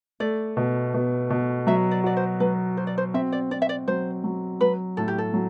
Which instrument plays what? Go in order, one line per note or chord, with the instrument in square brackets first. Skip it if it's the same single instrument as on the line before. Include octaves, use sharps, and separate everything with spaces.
[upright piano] A3 [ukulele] D5
[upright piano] B2
B2
B2
[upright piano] F#3 [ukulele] E5
[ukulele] D5
[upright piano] F#4 [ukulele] D5
[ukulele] C5
[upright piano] F#3 [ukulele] B4
[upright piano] F#4 [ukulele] C5
[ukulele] D5
C5
[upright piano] C4 [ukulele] E5
[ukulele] D5
[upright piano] C4 [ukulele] D5
[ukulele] E5
D5
[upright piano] F#3 [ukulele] C5
[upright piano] F#3
[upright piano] F#3 [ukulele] B4
[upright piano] A2 [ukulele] A4
[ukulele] G4
A4
[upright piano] F#3